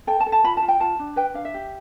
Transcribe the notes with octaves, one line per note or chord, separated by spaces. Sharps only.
A4 G5
A5
A4
A5
F4 B5
A5
F4
G5
F4 A5
D4
B4 G5
D4 F5
E5
G4